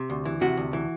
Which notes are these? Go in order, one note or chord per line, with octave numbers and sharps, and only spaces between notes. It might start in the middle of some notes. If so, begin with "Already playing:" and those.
Already playing: C3
D2
E3
C3 F#4
D2
E3